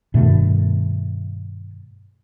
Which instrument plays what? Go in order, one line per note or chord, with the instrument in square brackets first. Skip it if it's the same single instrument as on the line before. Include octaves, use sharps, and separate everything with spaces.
[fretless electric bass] G2 B2 D#3 A3